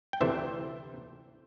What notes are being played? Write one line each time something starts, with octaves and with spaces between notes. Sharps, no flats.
G5
D2 C3 E3 A3 C5 E5